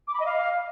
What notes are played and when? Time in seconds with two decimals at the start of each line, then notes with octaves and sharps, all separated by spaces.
0.08 D6
0.14 B5
0.20 D#5
0.26 F5